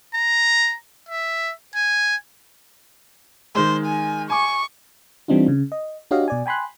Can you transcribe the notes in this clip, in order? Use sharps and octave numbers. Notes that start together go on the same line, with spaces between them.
A#5
E5
G#5
D#3 G#3 C5
G#5
G#5 C#6 D6
E3 G3 C4 D4 D#4 F4
C#3
D#5
D4 F#4 G4 C#5 D#5 F5
B2 D5 G#5
G5 G#5 B5 C6 F#6